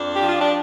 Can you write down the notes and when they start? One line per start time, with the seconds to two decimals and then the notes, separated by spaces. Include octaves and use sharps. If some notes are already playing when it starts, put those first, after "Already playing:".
Already playing: F2 D4
0.14 F3 G4
0.27 F4
0.40 D4